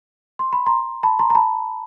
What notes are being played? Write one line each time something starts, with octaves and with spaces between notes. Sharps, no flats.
C6
B5
A#5 C6
A5 B5
A#5 C6
A#5
A5 B5